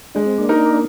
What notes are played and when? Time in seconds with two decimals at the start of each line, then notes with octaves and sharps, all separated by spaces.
0.15 G#3 D4
0.26 C4
0.38 A#3 D4
0.49 D#4 A#4